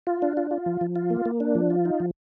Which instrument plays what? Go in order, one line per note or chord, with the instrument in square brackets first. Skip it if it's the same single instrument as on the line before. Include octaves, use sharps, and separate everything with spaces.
[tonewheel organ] F4
D4
F4
F4
F3
F3
F4
A#3
A#3
D4
F3
F4
D#4
F3